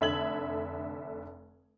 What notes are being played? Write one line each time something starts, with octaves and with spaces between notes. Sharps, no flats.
F1 D3 E5 A5 G#6 F#7